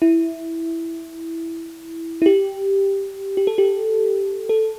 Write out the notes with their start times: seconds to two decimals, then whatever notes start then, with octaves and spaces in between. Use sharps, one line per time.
0.02 E4
2.22 E4
2.26 G4
3.37 G4
3.47 A4
3.58 G4
4.49 A4